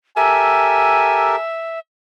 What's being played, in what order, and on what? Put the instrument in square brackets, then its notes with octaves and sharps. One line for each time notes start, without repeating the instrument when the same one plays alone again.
[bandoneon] G4 A4 A#4 [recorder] E5 [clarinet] G#5